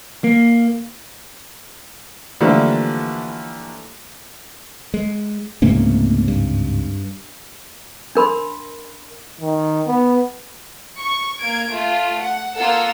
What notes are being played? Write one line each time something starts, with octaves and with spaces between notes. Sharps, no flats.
A#3
D3 E3 F3 G3 A3 A#3
G#3
C#2 G#2 C3 A3 A#3 C#4
G2
D4 A#4 B5 C6
D#3
B3
C#6
A#3 G#6 D7
A3 F4
F#5
A#3 F4 A4 F#5 E6